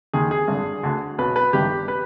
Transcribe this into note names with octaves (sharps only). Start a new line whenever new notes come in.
D#2 D#3 G#4
G#4
G#1 G2 D3
D2 D3
B1 B2 B4
B4
G1 G2 D#3 G4
B4